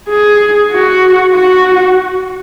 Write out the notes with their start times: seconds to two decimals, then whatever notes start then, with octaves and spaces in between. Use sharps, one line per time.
0.09 G#4
0.72 F#4
1.34 F#4